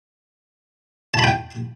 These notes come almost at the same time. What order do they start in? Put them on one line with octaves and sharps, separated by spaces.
A5 B5 G5